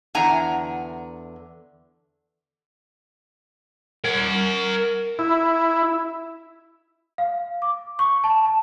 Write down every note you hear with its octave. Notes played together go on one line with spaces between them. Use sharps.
E2 D3 F#5 G#5 A#5
A#4 F#5
E4
F5
D6
C#6
A5
A5